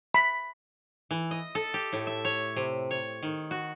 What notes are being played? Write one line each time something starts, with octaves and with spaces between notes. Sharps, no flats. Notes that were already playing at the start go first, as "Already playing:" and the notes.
B5
E3
D#5
A4
G4
A2
E5
C#5
C3
C#5
D#3
F#4